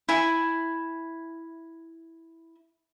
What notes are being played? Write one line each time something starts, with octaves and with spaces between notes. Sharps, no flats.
E4 G#5